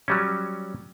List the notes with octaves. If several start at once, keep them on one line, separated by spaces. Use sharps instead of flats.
F#3 G3 C#4